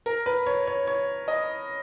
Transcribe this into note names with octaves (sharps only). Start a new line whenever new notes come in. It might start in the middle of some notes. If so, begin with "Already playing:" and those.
A#4
B4
C#5
C#5
C#5
D#5